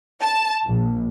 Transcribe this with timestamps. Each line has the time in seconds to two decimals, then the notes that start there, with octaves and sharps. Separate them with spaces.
0.22 A5
0.66 A#1